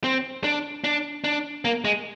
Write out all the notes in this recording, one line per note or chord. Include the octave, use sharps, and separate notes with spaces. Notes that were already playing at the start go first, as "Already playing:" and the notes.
C4
D4
D4
D4
A#3
G#3